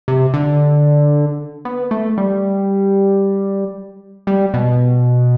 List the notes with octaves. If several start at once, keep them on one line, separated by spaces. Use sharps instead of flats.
C3
D3
B3
A3
G3
G3
B2